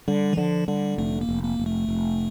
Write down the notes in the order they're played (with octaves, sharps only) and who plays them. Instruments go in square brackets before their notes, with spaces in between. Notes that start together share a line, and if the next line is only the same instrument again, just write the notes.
[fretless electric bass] D3 [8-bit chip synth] G3
[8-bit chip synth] E3
[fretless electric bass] D3 [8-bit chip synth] F3
[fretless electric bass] D3 [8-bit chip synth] G3
[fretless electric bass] F1 [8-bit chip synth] A3
[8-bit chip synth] A#3
[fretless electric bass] F1
[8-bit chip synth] A#3
[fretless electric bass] F1
[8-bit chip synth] A3
[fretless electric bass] F1